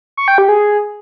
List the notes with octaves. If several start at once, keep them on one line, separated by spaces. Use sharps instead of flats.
C#6
G5
G4
G#4